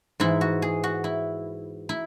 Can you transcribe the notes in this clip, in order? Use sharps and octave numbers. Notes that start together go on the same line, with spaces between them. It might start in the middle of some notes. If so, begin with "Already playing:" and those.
G#2 E3 E4
F#4
G#4
F#4
E4
E4